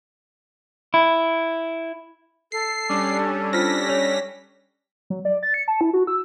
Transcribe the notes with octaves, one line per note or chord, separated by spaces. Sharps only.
E4
A4 C7
G3 C#4 D4 D6
F4 C5 F6 A#6 B6
C#5 F7
F#3
D5
A6
C#7
A5
E4
F#4
E6